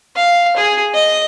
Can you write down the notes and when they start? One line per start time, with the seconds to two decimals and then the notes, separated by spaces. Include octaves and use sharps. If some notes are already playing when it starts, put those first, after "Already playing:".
0.16 F5
0.57 G#4
0.94 D#5